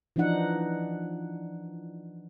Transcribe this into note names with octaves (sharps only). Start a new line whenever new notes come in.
E3 F3 D4 D#4 F#5